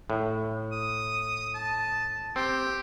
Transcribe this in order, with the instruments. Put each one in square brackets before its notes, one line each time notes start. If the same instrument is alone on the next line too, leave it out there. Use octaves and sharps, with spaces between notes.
[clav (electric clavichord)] A2
[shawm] D#6
A5
[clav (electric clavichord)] C4 [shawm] G4